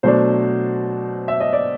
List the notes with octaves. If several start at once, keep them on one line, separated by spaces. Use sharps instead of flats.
B2 F#3 A3 D4 C5
E5
D#5
D5